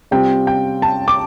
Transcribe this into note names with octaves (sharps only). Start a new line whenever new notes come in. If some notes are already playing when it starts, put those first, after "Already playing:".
C3 G3 C4 F4 G5
G5
A5
D6